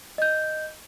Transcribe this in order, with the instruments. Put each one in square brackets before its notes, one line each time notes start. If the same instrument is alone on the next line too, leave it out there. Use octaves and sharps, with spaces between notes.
[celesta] D#5 G6